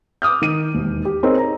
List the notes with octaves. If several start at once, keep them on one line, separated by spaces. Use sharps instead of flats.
D6 D#6 F6 G6
D#3 D#7
E1 D#2
G4
C4 D#4 G#4 A#4 C#5
A#5